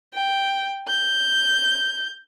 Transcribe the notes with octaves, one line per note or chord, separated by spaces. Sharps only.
G5
G6